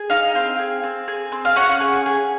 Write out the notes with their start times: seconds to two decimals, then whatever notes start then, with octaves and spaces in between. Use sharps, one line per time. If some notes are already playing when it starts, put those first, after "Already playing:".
Already playing: G#4
0.10 D#4 F5
0.35 C4
0.59 G#4
0.84 C4
1.08 G#4
1.32 C4
1.45 F5
1.56 C#4 F#5
1.80 G#4
2.06 G#4